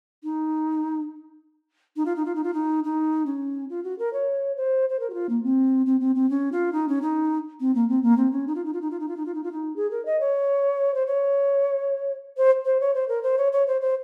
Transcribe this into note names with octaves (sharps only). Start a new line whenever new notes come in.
D#4
D#4
F4
D#4
F4
D#4
F4
D#4
D#4
C#4
F4
F#4
A#4
C#5
C5
C5
A#4
F#4
F4
A#3
C4
C4
C4
C4
C#4
F4
D#4
C#4
D#4
C4
A#3
C4
A#3
C4
C#4
D#4
F4
D#4
F4
D#4
F4
D#4
F4
D#4
F4
D#4
F4
D#4
G#4
A#4
D#5
C#5
C5
C#5
C5
C5
C#5
C5
A#4
C5
C#5
C#5
C5
C5